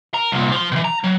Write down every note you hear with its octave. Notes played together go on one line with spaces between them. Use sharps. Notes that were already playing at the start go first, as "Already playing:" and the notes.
A#4
C2 A#2
F3 C6
B2 E3
A#5
F#3